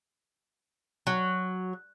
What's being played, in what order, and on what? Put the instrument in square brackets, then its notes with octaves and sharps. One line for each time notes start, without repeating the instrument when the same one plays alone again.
[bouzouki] F#3